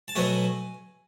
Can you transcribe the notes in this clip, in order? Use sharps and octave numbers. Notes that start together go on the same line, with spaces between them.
A5
B2 F#3 A3 G#5